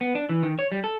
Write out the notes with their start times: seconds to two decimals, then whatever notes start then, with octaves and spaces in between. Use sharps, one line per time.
0.01 B3
0.15 D4
0.29 E3
0.43 D#3
0.59 C#5
0.72 G3
0.84 A4